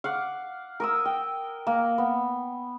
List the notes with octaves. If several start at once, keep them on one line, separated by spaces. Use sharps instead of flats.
F5 F#5 C#6 D6
A#4 D#6 E6
G5
A#3
B3